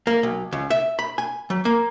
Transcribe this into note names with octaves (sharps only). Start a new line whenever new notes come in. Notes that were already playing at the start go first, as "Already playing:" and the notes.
A#3
B1
C#2
E5
B5
G#5
F#3
A#3